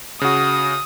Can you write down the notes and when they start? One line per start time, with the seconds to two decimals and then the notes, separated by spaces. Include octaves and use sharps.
0.21 C#3 F#4 D#6